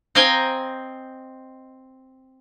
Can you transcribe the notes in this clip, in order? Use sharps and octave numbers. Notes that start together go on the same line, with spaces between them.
C4 D#5 F5 G5 G#5 A#5